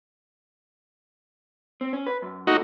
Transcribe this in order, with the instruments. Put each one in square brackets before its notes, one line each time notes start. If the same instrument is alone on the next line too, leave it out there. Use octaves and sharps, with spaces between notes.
[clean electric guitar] C4
C#4
B4
F#2
[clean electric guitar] C#2 A#2 A3 [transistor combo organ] D#4 F#4